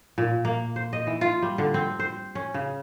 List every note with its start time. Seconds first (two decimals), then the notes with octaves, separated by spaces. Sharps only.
0.18 A#2
0.45 A#3
0.76 C5
0.93 D#5
1.07 E3
1.21 F4
1.42 G3
1.58 D3
1.74 C4
1.99 C5
2.35 C#4
2.54 C#3